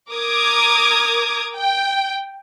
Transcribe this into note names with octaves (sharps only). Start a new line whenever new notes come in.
A#4 D6 D#6 G#6
G5